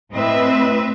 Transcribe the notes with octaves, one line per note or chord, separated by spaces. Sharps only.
A2 C4 B4 D#5 E5